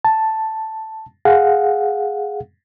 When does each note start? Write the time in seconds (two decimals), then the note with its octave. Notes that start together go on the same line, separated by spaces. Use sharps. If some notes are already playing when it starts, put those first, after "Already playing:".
0.05 A5
1.25 G#4 F5 F#5